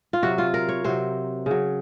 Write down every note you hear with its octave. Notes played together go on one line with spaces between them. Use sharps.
F4
C3 F#3 F#4
F4
A#4
C#5
C3 F#3 C5
C#3 F#3